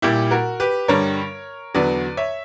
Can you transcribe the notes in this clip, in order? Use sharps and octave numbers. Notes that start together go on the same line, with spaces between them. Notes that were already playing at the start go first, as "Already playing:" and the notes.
A#2 G3 E4 G4
F#4 A#4
G4 B4
G2 D3 G3 A#4 C#5
E2 D3 F#3 B4 D5
C#5 E5